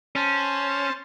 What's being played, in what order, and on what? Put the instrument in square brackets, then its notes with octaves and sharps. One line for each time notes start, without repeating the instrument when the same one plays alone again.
[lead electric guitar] C#4 [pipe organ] C5 A5